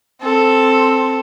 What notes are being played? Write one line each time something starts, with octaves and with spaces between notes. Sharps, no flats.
C4 A4